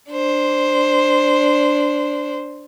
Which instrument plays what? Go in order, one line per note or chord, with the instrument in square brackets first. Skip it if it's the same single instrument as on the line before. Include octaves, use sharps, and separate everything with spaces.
[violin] D4 C5